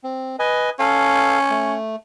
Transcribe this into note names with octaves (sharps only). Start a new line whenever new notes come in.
C4
B4 D#5 G#5
C#4 A4 F5
A3